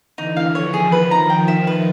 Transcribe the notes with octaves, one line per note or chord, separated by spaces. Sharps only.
D3 E3 D#4
F5
D#3 F3 C#5
G#4
B4
A#5
D#3 F3 G5
E5
B4